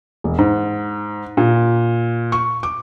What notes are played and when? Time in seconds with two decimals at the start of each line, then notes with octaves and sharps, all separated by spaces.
0.24 E1
0.38 G#2
1.37 A#2
2.32 C#6
2.63 D6